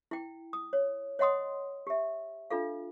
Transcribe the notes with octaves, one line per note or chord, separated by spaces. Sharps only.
E4 G5
D#6
C#5
C#5 D#5 F#5 C6 D#6
G4 E5
D4 F4 A4 F5